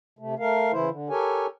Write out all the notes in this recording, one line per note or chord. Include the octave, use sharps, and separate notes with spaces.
C3 A3
A3 A#4 F5
C#3 E3 E4 C5
D3
G4 A4 A#4 C#5 G#5